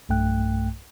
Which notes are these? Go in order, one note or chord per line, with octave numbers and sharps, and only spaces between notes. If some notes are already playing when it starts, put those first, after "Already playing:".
B1 G2 A3 G5 F#6